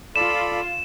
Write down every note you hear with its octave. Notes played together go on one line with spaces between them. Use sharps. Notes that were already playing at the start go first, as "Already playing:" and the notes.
F4 A4 D5 B5 E7